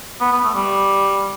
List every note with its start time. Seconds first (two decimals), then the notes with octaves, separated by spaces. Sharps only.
0.21 B3
0.32 B3
0.44 A3
0.55 G3